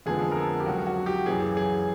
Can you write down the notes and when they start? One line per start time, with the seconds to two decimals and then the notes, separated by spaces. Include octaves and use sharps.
0.06 F2 D3 F3 G#3 B3 G#4
0.32 A#4
0.37 A4
0.60 G4
0.66 C#2 C#3 F#3 F#4
0.87 F#4
1.06 G4
1.26 F#2 C#3 E3 G#4
1.57 G#4